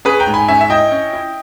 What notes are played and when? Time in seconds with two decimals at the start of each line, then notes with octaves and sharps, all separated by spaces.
0.05 C#4 G#4 B4
0.20 G5 A#5
0.27 G#2
0.34 G#5 B5
0.48 C#4 E5 G#5
0.61 E5
0.70 E4 D#5 G5
0.91 C#4
1.13 E4